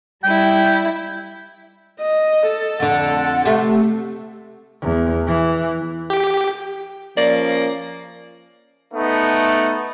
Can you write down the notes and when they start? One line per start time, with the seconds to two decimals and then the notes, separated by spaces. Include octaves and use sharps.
0.24 G3 E4 G5
2.00 D#5
2.48 A4
2.80 F2 D3 F#5
3.45 C3 A3
4.82 E2
5.27 E3
6.10 G4
7.17 F3 A#3 C#4 D5
8.94 A3 B3 D#4